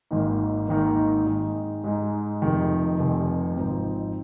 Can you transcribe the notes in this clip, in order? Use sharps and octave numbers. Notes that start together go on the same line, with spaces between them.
G#1 G#2 D#3 A#3 D#4
G#1 G#2 D#3 A#3 D#4
G#2 G#3 D#4
G#2 G#3 D#4
F1 F2 C3 D#3
F1 F2 C3 D#3
G#1 G#2 F3 C4 D#4